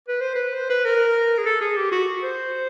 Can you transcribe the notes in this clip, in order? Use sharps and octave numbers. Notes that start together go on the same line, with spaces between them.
B4
C5
B4
C5
B4
A#4
G#4
A4
G#4
G4
F#4
C5